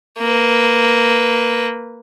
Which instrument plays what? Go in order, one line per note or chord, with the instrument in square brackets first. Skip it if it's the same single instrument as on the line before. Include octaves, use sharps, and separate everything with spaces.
[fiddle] A#3 B4